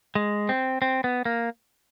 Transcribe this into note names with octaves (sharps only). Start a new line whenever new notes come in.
G#3
C4
C4
B3
A#3